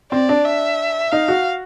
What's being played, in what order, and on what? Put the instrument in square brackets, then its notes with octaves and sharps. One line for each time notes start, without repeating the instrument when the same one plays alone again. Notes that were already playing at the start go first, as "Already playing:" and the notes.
[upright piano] C4 [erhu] D5
[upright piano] D4
[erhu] E5
[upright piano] D#4 [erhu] F5
[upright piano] F#4